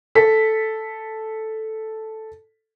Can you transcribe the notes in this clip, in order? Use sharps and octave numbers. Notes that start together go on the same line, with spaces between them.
A4 B6